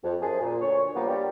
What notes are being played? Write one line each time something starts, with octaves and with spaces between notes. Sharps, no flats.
F2
F#2 F3 G#4
A#2
D2 C#5
A#2 F3 G3 A#3 B3
G2 G3 F4 G4